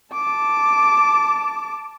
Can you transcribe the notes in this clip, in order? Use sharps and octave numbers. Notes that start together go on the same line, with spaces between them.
A5 D6